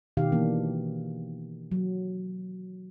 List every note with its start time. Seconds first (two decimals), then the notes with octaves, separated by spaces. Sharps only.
0.17 B2 D#3 G4 F5
0.32 E3 A#3 D4
1.71 F#3